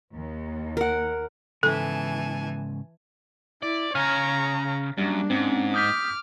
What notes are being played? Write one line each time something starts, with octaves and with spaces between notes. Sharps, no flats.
D#2
A#4 F#5
G#2 C#3 E3 A4 G#5 A5
E4 D5
C#3 C#5 G#5 A#5 F6
F#2 G3 A#3 D4
G#2 C4 C#4
D6 D#6 F6 G6 B6